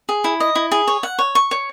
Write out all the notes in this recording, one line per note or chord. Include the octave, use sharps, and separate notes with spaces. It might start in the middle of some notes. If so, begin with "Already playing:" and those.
G#4
E4
D#5
E4
G#4
C#5
F#5
C#5
C#6
C#5